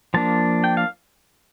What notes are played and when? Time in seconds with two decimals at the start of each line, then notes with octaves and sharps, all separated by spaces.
0.14 F3 A#3 D4 A5
0.64 G5
0.77 F5